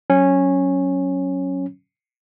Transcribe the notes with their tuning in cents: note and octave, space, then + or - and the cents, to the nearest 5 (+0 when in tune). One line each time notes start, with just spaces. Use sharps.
F#3 +0 C#4 -10